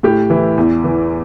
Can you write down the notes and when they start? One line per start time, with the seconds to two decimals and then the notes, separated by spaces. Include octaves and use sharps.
0.03 A2 G4
0.30 E3 E4
0.58 E2
0.84 E3